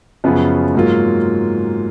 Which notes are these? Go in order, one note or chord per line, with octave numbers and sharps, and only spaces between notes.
F#2 C#3 F3 B3 F4
G#2 F#3 A#3 F4